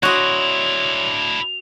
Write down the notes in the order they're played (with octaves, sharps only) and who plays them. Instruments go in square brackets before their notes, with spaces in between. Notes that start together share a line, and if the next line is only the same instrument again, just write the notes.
[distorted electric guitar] D4 E4 [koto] F#4 D#5 [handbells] C#5 C6 [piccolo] F7